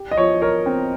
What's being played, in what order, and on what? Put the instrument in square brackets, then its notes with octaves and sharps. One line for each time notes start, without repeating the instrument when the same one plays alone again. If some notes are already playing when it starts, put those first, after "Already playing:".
Already playing: [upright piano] G4
[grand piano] D#5
[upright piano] F3 [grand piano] C#5
[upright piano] A#4 [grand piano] C#5
[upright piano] C4